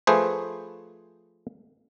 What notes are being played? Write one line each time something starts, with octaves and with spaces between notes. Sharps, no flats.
F3 A3 G#4 B4 C5